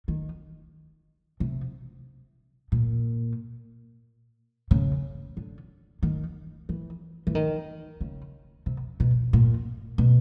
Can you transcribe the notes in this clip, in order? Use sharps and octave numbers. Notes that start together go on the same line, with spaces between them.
D#3
C3
A#2
C#3
D3
D#3
E3
E3
D#3
C#3
C3
B2
A#2
B2